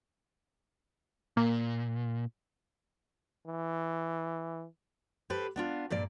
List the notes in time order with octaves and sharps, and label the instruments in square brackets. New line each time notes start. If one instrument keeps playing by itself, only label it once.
[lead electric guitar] A#2 [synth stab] A#3
[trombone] E3
[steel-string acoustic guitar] G4 A4 B4 C5
B3 D4 F4
G2 A#2 A#3 D5